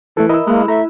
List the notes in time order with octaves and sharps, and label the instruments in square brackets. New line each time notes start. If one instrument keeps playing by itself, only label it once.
[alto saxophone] E3 [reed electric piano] A3 A4
[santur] E4 E6 [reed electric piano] A#4 D#5 E5
[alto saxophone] G#3 [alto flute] A#3 [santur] B4
[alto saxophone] A3 [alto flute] E5 [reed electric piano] A#5